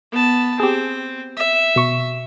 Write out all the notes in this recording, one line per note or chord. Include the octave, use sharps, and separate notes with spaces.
B3 A5
C4 G4 G#4
E5
B2 C#6